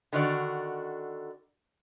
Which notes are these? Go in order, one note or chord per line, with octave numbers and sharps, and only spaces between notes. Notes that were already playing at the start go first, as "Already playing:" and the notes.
D3 D#3 F#4 D5